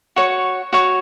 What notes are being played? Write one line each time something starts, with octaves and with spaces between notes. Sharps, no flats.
F#4 C#5
F#4 C#5